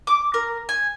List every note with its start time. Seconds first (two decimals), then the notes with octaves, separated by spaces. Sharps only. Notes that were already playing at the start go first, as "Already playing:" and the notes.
0.07 D6
0.34 A#4
0.69 G#5